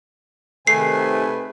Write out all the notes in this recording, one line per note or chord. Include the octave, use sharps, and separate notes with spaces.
C3 D#3 A3 G#4 B4 G#5 C7